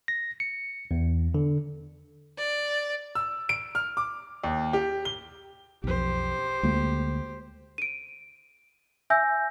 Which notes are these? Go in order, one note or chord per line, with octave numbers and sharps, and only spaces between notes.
A#6
C#7
E2
D3
D5
E6
D7
F6
D6
D#2
G4
G7
B1 F2 G4 C5
D2 G#3 A#3
D7 D#7
E5 G#5 E6 G6 A#6